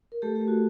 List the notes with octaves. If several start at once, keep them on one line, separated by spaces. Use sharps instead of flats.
A#4
A3 G4 A4
G4
A3
F#4